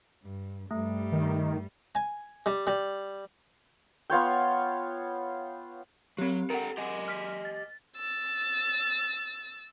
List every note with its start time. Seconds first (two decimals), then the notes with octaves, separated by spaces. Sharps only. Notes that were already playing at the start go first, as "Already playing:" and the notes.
0.24 G2
0.71 G2 G3 A3
1.12 D#3
1.95 G#5
2.46 G3
2.67 G3
4.10 B3 F4 C#5 G5
6.18 F#3 C4 G4 C#5
6.50 A4 A#4 F#5 G5 A#5
6.77 G4 D#5 G#5
7.08 F6 B6
7.45 A6
7.97 E6 A6